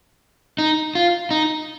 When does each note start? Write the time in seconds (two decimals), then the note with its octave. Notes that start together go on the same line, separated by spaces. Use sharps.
0.59 D#4
0.95 F4
1.31 D#4